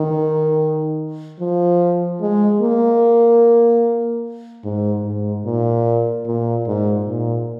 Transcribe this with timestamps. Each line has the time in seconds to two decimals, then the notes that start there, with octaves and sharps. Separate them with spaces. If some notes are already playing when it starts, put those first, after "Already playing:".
Already playing: D#3
1.40 F3
2.21 G#3
2.62 A#3
4.64 G#2
5.05 G#2
5.45 A#2
6.27 A#2
6.67 G#2
7.08 A#2